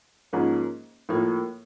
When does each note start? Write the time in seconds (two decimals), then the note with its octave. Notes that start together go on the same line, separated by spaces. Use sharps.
0.33 G#2 F3 A#3 C#4
1.09 A2 F3 A#3